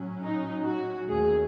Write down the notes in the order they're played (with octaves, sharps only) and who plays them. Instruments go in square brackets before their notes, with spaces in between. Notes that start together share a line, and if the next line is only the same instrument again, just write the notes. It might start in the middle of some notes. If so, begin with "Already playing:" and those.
Already playing: [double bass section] A2 F#3 C#4
[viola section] D#4
F#4
[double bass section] D#2 D#3 A3 C#4 [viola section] G#4